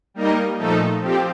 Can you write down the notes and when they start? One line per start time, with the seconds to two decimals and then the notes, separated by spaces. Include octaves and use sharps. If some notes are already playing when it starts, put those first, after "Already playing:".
0.14 G3 A#3 D#4 A#4 D#5
0.58 A#2 F3 A3 D#4 A4
1.01 F3 C4 G4